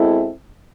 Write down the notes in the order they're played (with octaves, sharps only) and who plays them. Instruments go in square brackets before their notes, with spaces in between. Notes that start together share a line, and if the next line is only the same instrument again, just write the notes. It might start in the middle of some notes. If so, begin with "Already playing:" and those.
Already playing: [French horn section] B2 G#3 C4 E4 A4